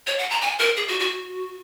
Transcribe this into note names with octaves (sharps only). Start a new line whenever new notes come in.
C#5
F#5
A#5
G#5
A#4
G#4
F#4
F#4